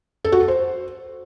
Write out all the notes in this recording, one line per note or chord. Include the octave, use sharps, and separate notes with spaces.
A4
F#4
A4
C5